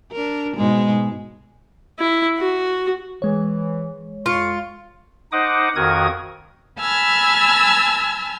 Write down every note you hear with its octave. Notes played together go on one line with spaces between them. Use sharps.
D4 A#4
G#2 B2 G#3
E4
F#4
E3 G#3 C#5
F2 E4 F4 C#6
D#4 C5 D#5 F#5 D6 D#6
F2 D#3 F#4 A#4 D#6 G#6
G#5 A5 B5 E6 F6 G#6